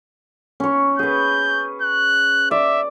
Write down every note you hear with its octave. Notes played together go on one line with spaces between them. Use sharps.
C#4 C#5
G#4 B4 G6
F#6
D5 E5